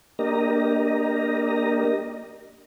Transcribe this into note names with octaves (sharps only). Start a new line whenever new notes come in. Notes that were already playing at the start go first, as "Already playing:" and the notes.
A#3 D4 G4 A#4 D#5 A#5